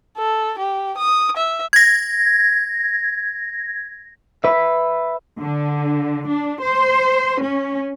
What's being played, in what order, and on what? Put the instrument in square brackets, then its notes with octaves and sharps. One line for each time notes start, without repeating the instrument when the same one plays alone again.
[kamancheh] A4
G4
D#6
E5
[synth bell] G#6 A#6
[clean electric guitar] B4 E5
[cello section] D3
D4
C5
C#4